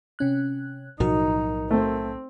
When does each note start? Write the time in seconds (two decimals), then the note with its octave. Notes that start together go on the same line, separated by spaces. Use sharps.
0.19 C3 C#4 F#6
1.00 B1 A2 F3 D#4 F#4 A#4
1.71 A3 C4